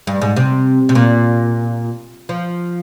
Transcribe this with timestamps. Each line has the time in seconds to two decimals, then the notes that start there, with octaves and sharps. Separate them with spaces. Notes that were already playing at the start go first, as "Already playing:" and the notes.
0.07 G2
0.21 G#2
0.36 C3
0.89 C3
0.95 A#2
2.29 F3